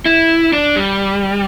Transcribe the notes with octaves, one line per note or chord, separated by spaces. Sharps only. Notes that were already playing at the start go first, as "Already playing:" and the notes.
E4
D4
G3